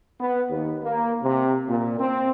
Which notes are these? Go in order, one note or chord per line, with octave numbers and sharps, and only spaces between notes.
B3
D#2
A#3
C3
A#2
C4